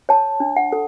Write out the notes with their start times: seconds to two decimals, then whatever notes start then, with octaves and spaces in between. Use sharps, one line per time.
0.09 C#5 A5
0.40 D4
0.56 F#5
0.72 A4